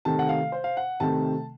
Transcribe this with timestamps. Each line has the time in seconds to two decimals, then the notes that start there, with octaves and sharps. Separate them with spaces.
0.05 C3 D#3 A3 C4 A5
0.19 F#5
0.29 F5
0.52 C5
0.64 F5
0.77 F#5
1.00 C3 D#3 A3 C4 A5